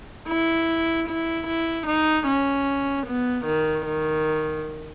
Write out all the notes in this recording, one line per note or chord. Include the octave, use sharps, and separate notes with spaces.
E4
E4
E4
D#4
C#4
B3
D#3
D#3